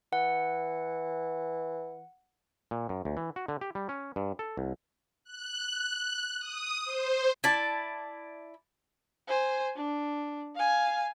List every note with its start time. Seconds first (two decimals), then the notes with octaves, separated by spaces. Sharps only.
0.13 E3 F#5
2.71 A#2
2.89 F#2
3.05 D2
3.17 E3
3.36 F#4
3.48 D3
3.61 G4
3.75 G3
3.89 C#4
4.16 G2
4.39 A4
4.57 C2
5.24 F#6
6.39 D#6
6.85 C5
7.44 E4 D5 A5
9.28 C5 G#5
9.76 D4
10.55 F5 G#5